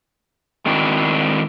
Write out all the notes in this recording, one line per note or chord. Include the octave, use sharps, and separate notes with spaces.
G#2 D#3 C4 D4 E4 F#4